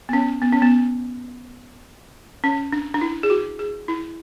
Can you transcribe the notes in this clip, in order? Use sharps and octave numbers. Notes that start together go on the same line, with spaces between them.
B3
C#4
B3
C#4
B3
C#4
D4
D4
E4
G#4
F#4
G#4
E4